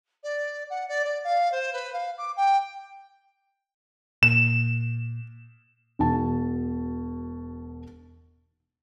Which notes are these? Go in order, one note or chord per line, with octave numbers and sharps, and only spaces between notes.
D5
F#5
D5
D5
F5
C5
B4
F5
D6
G5
A#2 E7
E1 B2 A5